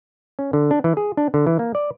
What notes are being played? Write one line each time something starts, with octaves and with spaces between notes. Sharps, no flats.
C#4
D3
D4
E3
G#4
D4
D3
E3
A#3
D5